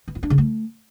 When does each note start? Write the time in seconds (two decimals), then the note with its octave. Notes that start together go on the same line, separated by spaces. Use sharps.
0.08 E3
0.15 E4
0.23 D4
0.30 C#3
0.38 A3